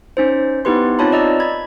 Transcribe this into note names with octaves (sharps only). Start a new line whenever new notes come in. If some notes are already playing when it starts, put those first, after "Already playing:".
C#4 D#4 C5
B3 D#4 E4 G4 B4 C6
C4 D#4 F4 C#5 A5 B5
D5 D#5 A#5 E6
B5 G#6